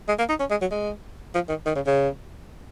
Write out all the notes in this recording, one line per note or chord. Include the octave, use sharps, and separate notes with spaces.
G#3
A#3
D#4
C#4
G#3
F#3
G#3
F3
D#3
D#3
C#3
C#3